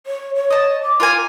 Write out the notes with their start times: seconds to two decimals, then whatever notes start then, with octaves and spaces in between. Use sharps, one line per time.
0.07 C#5
0.36 C#5
0.50 D#5 A5
0.83 D6
1.00 F4 A#4 G#5